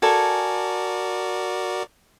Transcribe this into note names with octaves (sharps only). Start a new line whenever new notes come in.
F#4 A4 A#4 D5 G#5